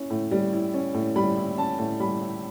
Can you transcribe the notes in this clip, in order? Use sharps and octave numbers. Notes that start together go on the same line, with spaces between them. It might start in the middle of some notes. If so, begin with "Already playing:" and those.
Already playing: C#4 E4
A2
G3
E4
C#4
A2
G3 B5
E4
C#4 A5
A2
G3 B5
E4